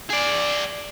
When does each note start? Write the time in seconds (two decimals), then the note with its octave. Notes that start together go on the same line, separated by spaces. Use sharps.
0.10 G#4 D5